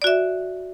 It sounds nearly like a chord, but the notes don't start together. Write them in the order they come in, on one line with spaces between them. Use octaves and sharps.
D5 F#4 E5